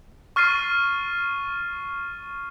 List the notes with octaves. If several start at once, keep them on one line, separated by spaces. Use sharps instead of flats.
C#6 F6 A6 C7 D#7